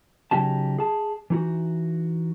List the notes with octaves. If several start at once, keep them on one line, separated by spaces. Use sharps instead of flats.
C#3 F3 F#3 D#4 G4 A5
G#4 A5
E3 D#4 F#4